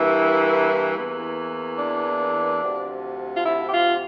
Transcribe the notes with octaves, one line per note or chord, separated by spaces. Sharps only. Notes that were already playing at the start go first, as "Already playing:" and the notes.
Already playing: G2 E3 A#3 E4
E2 E3 A#3
D4
D2 C3 F3
F4
E4
G4
F4